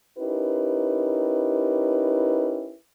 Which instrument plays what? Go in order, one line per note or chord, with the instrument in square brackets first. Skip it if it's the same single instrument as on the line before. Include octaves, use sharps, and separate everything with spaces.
[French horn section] C#4 D#4 E4 G4 A#4 B4